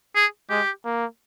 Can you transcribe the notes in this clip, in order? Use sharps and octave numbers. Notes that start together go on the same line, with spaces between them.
G#4
G#3 G4
A#3